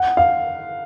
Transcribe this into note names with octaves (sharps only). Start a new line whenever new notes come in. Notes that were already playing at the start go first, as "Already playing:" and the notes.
Already playing: F#5
F5